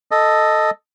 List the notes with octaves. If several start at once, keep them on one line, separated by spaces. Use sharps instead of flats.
A4 D#5